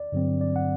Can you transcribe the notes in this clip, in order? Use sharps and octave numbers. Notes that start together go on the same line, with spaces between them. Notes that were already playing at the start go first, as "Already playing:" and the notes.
Already playing: D5
G2 D3 F#3 C4
D5
F#5